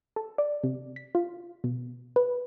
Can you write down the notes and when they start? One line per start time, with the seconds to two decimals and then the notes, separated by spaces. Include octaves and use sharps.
0.16 A4
0.38 D5
0.63 C3
0.96 B6
1.15 F4
1.64 B2
2.16 B4